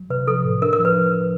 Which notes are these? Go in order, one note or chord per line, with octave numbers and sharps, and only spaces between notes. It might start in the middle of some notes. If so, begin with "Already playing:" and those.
Already playing: F#3
C3 B4
F3 A4
A2
D4 A#4
A#4
F3
B4